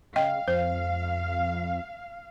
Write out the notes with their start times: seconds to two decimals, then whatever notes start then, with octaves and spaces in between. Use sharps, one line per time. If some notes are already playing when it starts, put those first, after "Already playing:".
0.16 C#3 D#5 F5 G5
0.48 F2 C5